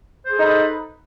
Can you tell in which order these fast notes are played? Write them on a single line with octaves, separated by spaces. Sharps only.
C5 G#4 A4 D#4 B4